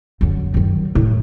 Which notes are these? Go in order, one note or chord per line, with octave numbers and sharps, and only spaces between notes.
F#2 D3
D#3 F#3
A2